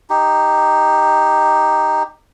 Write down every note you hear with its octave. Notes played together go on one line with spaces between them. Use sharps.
D#4 G4